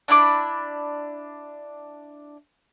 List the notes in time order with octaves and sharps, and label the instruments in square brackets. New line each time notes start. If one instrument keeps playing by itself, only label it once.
[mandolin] D4 E4 B5 D6